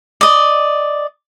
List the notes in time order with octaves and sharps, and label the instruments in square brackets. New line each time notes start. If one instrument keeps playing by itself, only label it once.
[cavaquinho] D5 D#5